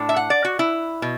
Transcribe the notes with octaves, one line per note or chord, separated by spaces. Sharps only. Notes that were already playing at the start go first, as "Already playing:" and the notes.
Already playing: A2 D4
E5
F#5
D5
F#4
E4
B2